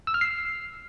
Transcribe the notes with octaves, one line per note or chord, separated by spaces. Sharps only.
E6
F6
C7